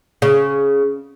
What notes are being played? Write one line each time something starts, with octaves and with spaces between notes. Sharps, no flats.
C#3